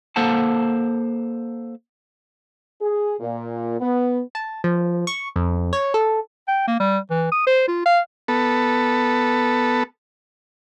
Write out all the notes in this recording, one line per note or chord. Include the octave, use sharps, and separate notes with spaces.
A#3 A4 C5 F#5 A5
G#4
A#2
B3
A5
F3
C#6
F2
C#5
A4
G5
A#3
G3
E3
D#6
C5
F4
F5
B3 A4